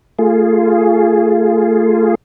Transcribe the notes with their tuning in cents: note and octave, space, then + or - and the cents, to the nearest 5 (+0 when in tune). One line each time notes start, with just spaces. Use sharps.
A3 +15 F4 -15 G#4 +0